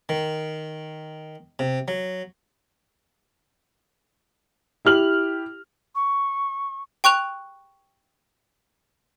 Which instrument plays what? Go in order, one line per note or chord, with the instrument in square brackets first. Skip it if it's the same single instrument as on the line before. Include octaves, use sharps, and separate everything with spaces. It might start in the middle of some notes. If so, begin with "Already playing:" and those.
[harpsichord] D#3
C3
F#3
[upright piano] E4 G4 F6 F#7
[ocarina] C#6
[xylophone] G5 C#6 F#6 F7